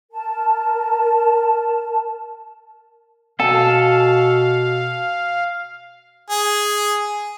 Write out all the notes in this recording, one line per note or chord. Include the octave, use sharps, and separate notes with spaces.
A#4 A5
B2 A4 F5 G#5
G#4